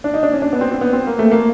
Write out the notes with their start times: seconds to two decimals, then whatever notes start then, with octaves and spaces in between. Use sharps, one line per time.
0.04 D4
0.14 D#4
0.23 D4
0.33 C#4
0.42 D4
0.53 B3
0.61 C4
0.71 C4
0.81 B3
0.93 C4
1.07 A#3
1.19 A3
1.32 A#3